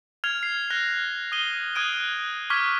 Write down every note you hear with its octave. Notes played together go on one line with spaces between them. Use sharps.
F6 G#6 C7 F7
C7
F6 F#6 A#6
D#6 G#6 D#7 G7
D#6 F#6 G#6 D7 D#7
C#6 D6 F6 G#6 B6